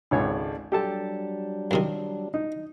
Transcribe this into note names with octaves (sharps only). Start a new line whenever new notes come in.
G#1 C#2 G#3 A4 C#5 D5
F#3 G3 D4 G4 A4 A5
F#2 C3 D#3
D#4